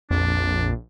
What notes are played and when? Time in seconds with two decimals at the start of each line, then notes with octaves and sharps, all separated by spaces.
0.11 A#1 F2 D4